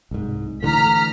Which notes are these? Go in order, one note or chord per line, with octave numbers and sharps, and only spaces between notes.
C2 G#2
D3 E3 A3 A#5 F6 B6